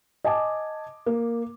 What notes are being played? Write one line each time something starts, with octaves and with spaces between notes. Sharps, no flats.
D#5 G#5 A5 D6
A#3